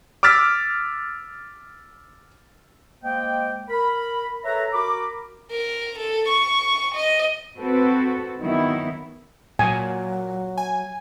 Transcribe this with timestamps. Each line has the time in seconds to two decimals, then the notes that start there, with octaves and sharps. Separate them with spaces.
0.23 D6 E6 F6 A6 B6
3.04 G#3 A#3 C5 D#5 G5
3.69 A#4 B5
4.44 A4 B4 C#5 E5 A#5
4.73 F#4 A#4 A#5 B5 D6
5.51 A#4
5.99 A4
6.29 C#6
6.95 D#5
7.57 C4 F#4 A4 B4
8.39 D#3 F#3 B3 E4
9.59 A#2 F#3 G#5
10.58 G#5